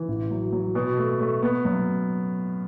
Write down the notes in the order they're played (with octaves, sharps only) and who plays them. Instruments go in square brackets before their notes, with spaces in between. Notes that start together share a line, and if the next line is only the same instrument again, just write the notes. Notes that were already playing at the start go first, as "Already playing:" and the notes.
Already playing: [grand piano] E3
A1
F#3
F#3
B2
A3
A3
B3
F#2